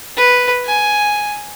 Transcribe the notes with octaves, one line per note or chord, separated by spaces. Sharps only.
B4
G#5